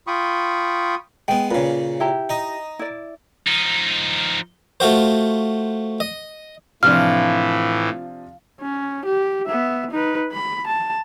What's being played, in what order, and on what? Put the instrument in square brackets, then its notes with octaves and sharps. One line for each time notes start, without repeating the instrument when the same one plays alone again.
[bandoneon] F4 G5 B5 C#6 D#6
[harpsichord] G#3 B3 [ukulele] G5
[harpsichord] A#2 C#3 [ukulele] C#4 B4
[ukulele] E4 G4 A#5
[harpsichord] D#4 D#5
[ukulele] E4 D5
[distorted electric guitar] F3 D#4
[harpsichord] A3 F4 F#4 C5
D#5
[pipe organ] A2 E3 [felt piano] C3 F3 D4 [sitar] F4 [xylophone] F6
[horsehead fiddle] C#4
G4
B3 E5
D#4 B4
B5
A5